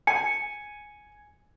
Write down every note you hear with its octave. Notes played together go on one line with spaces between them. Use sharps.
G#5 C#7